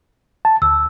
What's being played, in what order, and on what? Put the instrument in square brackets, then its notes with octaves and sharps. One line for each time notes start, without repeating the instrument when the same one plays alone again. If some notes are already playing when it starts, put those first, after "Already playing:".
[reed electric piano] A5
[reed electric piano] D2 [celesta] E6